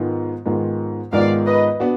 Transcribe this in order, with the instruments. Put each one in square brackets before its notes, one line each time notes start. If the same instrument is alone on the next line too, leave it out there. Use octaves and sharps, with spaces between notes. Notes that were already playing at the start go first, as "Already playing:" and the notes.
Already playing: [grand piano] G#2 D#3 G#3 B3 F4
G#2 D#3 G#3 B3 F4
[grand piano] G#2 D#3 G#3 B3 F4 [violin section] D5 F5
[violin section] B4 D#5
[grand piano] B3 D4 F#4